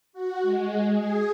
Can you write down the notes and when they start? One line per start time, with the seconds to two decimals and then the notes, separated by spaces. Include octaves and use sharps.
0.13 F#4
0.42 G#3
0.91 G#4